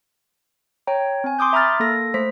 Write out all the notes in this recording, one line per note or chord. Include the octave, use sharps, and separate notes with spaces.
C#5 G5 A#5
C4 G#5
C6 D6 D#6 G6
E5 A#5 B5 F6 A6
A#3 A4 A#6
A3 C5 B6